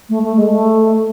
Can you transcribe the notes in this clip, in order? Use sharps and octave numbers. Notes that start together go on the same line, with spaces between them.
A3
A3
G#3
A3